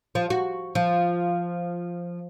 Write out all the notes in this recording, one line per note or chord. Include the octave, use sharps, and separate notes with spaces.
F3
F#4
F3